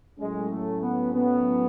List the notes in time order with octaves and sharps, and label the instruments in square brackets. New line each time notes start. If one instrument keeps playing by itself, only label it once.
[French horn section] A2 F#3 C#4 [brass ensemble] G#3
[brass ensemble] A3
B3
B3